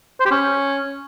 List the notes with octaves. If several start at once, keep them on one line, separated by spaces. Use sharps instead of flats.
C5
G4
C#4